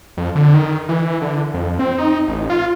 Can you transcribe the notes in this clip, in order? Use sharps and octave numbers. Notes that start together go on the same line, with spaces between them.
F2
D3
D#3
E3
D3
F2
C4
D#4
A1
F4